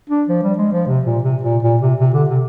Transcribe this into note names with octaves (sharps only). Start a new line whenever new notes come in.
D4
F3
G3
G#3
F3
C3
A#2
C3
A#2
A#2
C3
C3
D3
C3